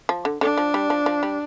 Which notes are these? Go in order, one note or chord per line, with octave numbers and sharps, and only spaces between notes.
F3
D3
D3 D4
F3
G3
F3
F3
G3